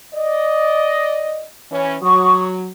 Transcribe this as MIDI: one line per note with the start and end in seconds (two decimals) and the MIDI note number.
0.14 1.44 74
0.14 1.44 75
1.72 1.96 52
1.72 1.96 61
2.02 2.69 54
2.02 2.45 85
2.02 2.45 87